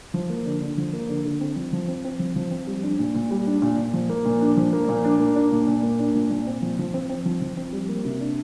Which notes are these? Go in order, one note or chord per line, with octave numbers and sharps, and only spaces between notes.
F3
A#3
D3
D3
F3
A#3
D3
D3
C4
F3
F3
C4
C4
F3
F3
C4
G3
D4
A#2
A#2
G3
D4
A#2
A#2
F3
A#3
A#2
D4
F3
A#3
A#2
D4
A#3
D4
A#2
A#2
A#3
D4
A#2
A#2
C4
F3
F3
C4
C4
F3
F3
C4
G3
A#3
C3
D4